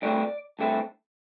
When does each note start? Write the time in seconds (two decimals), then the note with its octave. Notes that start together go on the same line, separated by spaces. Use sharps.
0.02 G2 D3 A3 C4 E4 D5
0.59 G2 D3 A3 C4 E4